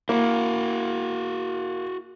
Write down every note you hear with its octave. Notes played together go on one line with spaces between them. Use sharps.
A#3 E4 F#4